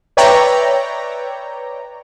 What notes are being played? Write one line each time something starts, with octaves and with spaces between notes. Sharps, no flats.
B4 C#5 D5 E5 G5 A#5